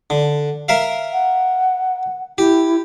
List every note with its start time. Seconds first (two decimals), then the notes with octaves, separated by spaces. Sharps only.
0.10 D3
0.68 A#4 E5 F5
1.13 F#5
2.38 E4 G4